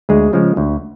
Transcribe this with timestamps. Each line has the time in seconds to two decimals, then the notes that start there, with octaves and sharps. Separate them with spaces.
0.09 D2 G#3 G#4
0.33 C#3 F3 G#3
0.57 D2